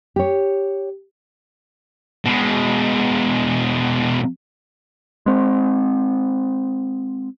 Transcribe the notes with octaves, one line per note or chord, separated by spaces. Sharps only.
G4 C#5
B2 G#3
G#3 C4